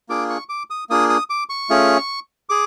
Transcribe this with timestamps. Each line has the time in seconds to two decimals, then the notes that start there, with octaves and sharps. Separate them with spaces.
0.09 A#3 D4 F4 G#4 D6
0.30 C#6
0.49 D6
0.70 D#6
0.90 A#3 D4 F4 G#4 D#6
1.10 D#6
1.30 D6
1.49 C#6
1.70 A3 C#4 F4 G#4
2.49 G#4 D6